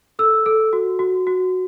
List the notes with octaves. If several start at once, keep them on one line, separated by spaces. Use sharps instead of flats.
A4 E6
A4
F#4
F#4
F#4